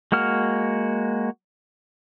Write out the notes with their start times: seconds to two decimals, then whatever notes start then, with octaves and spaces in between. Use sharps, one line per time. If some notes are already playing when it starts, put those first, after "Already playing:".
0.12 G#3 A#3 F#4 F6